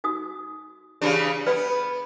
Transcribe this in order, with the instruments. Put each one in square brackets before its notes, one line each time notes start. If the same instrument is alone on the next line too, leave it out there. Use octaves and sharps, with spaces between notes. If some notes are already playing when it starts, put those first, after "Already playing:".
[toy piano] D#4 F#4 D#6
[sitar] C#3 E3 D4 [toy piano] G4
[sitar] B3 [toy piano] B4 D5 B5